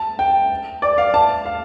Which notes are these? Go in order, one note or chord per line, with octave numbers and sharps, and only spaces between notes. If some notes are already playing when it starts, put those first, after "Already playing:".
Already playing: A5
G5
D5
F5
A5
F5